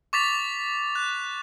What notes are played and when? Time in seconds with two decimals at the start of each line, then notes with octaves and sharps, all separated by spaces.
0.13 C#6 D6 A6 B6 F7
0.95 F#6